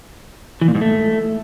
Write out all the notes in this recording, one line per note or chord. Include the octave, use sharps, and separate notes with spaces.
E3
A#2
G#2
A3